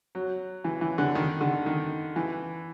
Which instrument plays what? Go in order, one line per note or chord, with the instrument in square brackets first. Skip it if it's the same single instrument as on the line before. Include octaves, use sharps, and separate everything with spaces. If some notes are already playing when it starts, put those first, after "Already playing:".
[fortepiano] F#3
E3
E3
D3
D#3
D3
D#3
E3